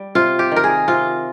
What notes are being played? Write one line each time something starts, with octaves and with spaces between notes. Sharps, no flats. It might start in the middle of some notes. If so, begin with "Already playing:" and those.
Already playing: G3
C3 F4
G4
D#3 A#4
G#4
C3 F4